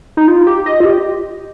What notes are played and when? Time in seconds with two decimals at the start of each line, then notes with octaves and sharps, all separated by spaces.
0.17 D#4
0.28 F4
0.47 G4
0.66 D#5
0.80 F4
0.85 G4